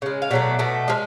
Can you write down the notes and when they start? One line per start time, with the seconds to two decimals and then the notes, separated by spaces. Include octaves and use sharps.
0.02 C#3 G#3
0.22 F5
0.31 B2 F#3 A3 D5
0.59 B2 A3
0.88 F3 G#3